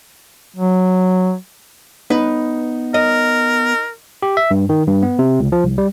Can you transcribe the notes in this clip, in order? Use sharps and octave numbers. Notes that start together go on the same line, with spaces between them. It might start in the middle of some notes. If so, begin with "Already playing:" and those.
F#3
B3 D#4 B4
A#4 D#5
G4
E5
G2
D#3
G2
B3
C3
C#2
F3
C2
G3